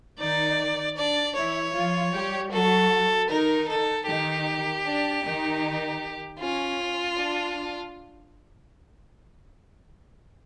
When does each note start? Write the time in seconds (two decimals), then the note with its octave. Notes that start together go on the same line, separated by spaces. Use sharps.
0.18 D#3 D#4 D5
0.97 D4 D5
1.35 E3 E4 C#5
1.73 F3 F4
2.12 G3 G4
2.51 F#3 F#4 A4
3.29 D#3 D#4 A#4
3.68 A4
4.06 D#3 D#4 G4
4.85 D4
5.24 D#3 D#4
6.39 C#4 F4
7.17 D4